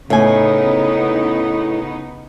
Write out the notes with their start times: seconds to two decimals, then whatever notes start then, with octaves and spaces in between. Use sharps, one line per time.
0.10 A2 C#3 B3 D#4 G#5